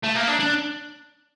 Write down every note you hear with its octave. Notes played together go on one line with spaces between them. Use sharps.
A3
A#3
D4
D4